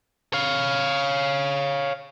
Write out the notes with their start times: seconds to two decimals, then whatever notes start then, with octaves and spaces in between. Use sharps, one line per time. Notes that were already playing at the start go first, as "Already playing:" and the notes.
0.33 C#5 F5